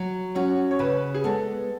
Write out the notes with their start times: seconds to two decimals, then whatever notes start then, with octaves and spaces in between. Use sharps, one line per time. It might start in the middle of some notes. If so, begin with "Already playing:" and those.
Already playing: F#3
0.35 C#4 F#4 C#5
0.71 C#5
0.79 C#3 B4
1.14 G#4
1.24 G#3 B3 A4